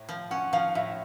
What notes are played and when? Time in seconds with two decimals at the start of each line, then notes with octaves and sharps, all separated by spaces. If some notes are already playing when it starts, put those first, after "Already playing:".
Already playing: A2
0.09 F3
0.31 C#4 F#5
0.53 F3 F5
0.75 A2 E5